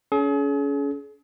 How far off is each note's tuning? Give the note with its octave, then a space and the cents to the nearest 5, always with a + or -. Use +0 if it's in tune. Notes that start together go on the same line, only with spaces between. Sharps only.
C#4 +30 G#4 +40